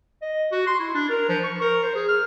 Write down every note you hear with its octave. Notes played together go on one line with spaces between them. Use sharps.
D#5
F#4
C6
E4
D4
A#4
F3
C#6
A#4
C5
G#4
F6